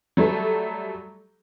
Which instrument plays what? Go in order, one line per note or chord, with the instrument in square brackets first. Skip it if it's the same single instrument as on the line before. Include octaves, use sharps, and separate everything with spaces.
[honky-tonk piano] F#3 G3 A3 A4